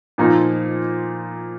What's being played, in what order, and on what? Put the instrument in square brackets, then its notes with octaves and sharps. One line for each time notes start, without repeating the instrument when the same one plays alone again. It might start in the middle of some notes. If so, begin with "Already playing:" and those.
[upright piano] A#2 F3 A#3 D#4